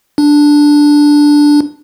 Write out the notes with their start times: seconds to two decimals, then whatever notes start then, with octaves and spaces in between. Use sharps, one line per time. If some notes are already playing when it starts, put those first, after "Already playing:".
0.18 D4